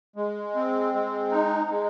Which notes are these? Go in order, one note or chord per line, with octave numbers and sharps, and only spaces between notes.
G#3
C4
G#3
D#4
G#3